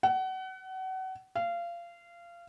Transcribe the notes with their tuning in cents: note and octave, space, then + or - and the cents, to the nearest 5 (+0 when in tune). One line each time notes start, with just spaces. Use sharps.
F#5 +30
F5 -25